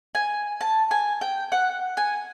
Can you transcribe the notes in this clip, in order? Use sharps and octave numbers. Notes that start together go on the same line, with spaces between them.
G#5
A5
G#5
G5
F#5
G#5